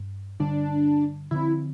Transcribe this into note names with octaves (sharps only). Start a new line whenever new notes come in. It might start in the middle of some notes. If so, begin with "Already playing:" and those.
Already playing: G2
G2 D3 G3 D4
D3 F3 A3 C4 E4